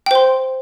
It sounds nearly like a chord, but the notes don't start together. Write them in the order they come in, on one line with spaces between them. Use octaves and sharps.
G5 C5 C6